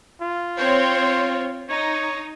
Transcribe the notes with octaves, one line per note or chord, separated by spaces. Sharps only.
F4
C4 C5 C#5
D#4 C#5